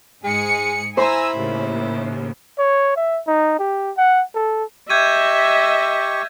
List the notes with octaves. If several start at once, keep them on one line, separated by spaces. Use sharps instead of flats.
G#2 G#3 G#4 C#7
E4 C5 G#5 A#5 C6 E6
D#2 A2 C#3
C#5
E5
D#4
G4
F#5
A4
G4 D#5 E5 C#6 G6 G#6 D#7